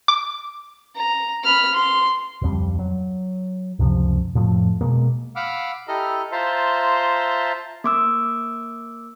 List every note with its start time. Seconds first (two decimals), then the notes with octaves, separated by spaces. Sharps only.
0.08 D6
0.95 A#5
1.44 B5 F6
1.74 C6
2.42 D1 F2 G3
2.79 F#3
3.79 C#2 F#2 C3 F3
4.35 F2 A2 F3 A3
4.81 B2 G#3 A#3
5.36 F5 F#5 B5 D6 E6 F6
5.88 E4 G4 A4 D#5 A#5 F6
6.32 F4 C5 E5 A5 A#5 C6
7.84 A#3 D6 E6